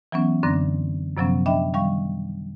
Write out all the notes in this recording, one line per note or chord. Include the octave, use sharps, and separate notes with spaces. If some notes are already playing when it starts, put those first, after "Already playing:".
E3 F#3 B3 C#4
F#2 D3 C4 D4 A#6
F#2 C3 F3 F#3 B3 C#4
D4 D#5 E5 G5 B5
D#3 G3 F5 C#6